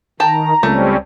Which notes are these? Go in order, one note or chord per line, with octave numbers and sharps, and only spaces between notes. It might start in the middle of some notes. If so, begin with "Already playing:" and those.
D#3 G5 A5 A#5
C#2 G3 A3 C4 C#4